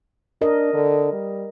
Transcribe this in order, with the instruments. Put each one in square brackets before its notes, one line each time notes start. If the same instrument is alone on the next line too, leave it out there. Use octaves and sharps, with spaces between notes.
[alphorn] D4 [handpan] A#4 D#5
[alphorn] D3
G3